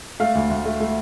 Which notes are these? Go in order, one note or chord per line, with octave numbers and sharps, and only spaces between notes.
A3 F5
D2
D2
A3
A3